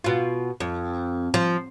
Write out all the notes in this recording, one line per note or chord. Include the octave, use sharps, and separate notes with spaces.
B2 F4
F2
F3